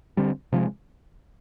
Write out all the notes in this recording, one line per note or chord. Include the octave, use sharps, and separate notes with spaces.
D3 G3 C4
C3 F3 G#3